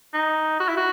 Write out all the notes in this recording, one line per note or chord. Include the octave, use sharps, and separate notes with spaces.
D#4
F#4
E4
F#4